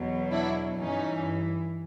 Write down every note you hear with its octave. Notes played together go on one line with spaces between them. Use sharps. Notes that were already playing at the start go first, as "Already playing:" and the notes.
Already playing: E2 B2 F#3
D4 E4
G2 E3 C#4 D#4